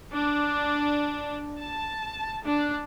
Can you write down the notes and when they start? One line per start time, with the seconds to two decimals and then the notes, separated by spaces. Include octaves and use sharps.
0.15 D4
1.61 A5
2.45 D4